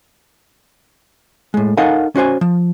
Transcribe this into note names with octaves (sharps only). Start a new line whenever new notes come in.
A2 G#3
D#4 A4 A#4 F5 F#5 G#5
C#4 F#4 C5 G#5
F3